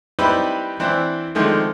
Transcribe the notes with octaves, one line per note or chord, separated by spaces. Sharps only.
G3 C4 D#4 E4 G4 B4
E3 C4 D4 E4
D3 D#3 F3 G#3 A3 C4